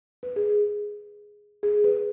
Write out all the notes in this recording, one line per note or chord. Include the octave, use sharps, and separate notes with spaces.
B4
G#4
G#4
B4